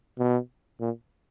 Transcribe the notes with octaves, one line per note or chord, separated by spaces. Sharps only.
B2
A#2